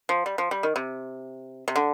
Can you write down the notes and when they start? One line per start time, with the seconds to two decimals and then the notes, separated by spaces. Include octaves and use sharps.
0.09 F3
0.26 G3
0.38 F3
0.51 G3
0.63 D#3
0.76 C3
1.68 C3
1.76 D3